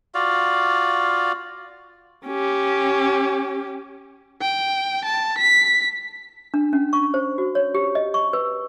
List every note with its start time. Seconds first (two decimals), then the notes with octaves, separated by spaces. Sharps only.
0.14 F4 F#4 D5 F5
2.27 C#4 G4
4.41 G5
5.04 A5
5.38 B6
6.54 D4
6.73 C#4
6.93 C#6
7.14 C5
7.38 F#4
7.55 C#5
7.75 G4
7.95 D#5
8.14 C#6
8.33 B4